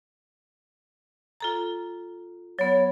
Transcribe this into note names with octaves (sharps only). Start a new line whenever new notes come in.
F4 A4 A#5
F#3 B3 C#5